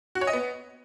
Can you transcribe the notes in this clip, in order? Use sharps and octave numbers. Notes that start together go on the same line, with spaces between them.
F#4
C#5
D#5
B3